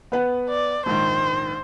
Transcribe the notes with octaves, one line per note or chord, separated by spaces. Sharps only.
B3 B4 F#5
D5
A#1 G#2 D#3 C5